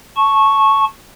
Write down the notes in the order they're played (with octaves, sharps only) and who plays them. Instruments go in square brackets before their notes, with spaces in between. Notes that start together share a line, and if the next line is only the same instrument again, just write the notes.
[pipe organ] A5 C#6